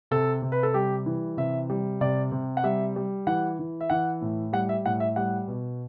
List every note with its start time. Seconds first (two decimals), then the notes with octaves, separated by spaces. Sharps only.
0.11 C3 A4
0.42 C3
0.52 B4
0.63 A4
0.74 G3 G4
1.06 E3
1.37 C3 E5
1.70 G3
2.01 C3 D5
2.32 C3
2.57 F#5
2.64 G3 E5
2.96 G3
3.27 E3 F#5
3.59 E3
3.81 E5
3.90 E3 F#5
4.21 A2
4.53 G3 F#5
4.69 E5
4.86 A2 F#5
5.00 E5
5.16 G3 F#5
5.48 B2